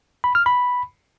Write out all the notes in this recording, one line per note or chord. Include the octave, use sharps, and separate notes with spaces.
B5
F6
B5